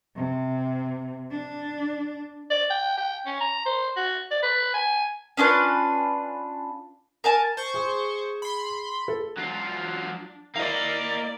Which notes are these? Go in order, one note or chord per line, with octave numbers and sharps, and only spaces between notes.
C3
D4
D5
G5
G5
C#4
A#5
C5
F#4
D5
B4
G#5
C#4 D4 F4 B4
A#4 G#5 A5
C5 C#6
G#4
B5 C6
A4
F#3 D4 F4
A#3 E4 D5 D#5 F5